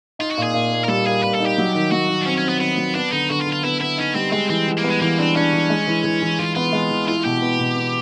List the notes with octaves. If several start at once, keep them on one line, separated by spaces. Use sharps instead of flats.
D#4 F4
F#4
A#2
G#4
A#2
A#3
A#4
G3 A4
A#3 G#4
A#2 B4
A4
D#4
G4
F#3
D#3
F#3 F#4
D#3
D4
C4 C#4
C#4
C4
B3
D#3 B3
F#3
B3 D4
D3 D#4
D3 F#4
F4
D3
F4
B3 E4
B3 E4
C#4 D#4
G3 C4
G#3 C4
E3 C4
E3
A#3
B3
G#3
E3 A#3
C4 D4
C#4 D4
E3
G#3
E3
E3
E3
E3 F4
B3 F4
G#3
E3
E4 F4
B2 G4
B3
B2
B3